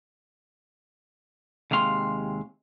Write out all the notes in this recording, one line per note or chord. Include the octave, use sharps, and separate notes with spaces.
D#2 C3 G#3 F5 C6